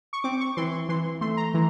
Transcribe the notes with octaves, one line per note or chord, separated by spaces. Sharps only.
C#6
C4 D6
C#6
E3 C6
E3 C6
A3 C6
A#5
E3